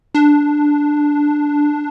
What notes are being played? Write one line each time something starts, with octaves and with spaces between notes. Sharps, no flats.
D4